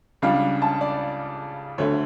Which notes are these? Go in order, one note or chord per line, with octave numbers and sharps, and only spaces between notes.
C#2 C#3 G3 D4 F5
A5
D5
D2 D3 A3 C#5